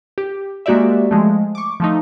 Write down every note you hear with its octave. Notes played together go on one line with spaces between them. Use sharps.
G4
G#3 A#3 F#4 G4 D5 E5
F3 G#3 A3
C#6 D6
F3 A3 D#4